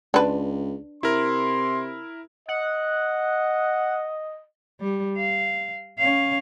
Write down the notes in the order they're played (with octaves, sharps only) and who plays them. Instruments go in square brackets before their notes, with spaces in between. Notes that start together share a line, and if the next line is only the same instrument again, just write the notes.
[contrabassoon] C#2 [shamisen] D4 B4
[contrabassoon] C3 [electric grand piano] E4 A#4 [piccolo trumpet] C6
[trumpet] D#5 [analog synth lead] F#5
[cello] G3
F5
C#4 F5